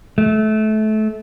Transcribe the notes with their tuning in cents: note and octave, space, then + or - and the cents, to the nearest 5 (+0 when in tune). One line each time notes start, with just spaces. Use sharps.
A3 -25